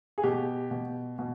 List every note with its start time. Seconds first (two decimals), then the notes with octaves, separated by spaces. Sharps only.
0.18 G#4
0.23 B2 G4
0.71 B2
1.19 B2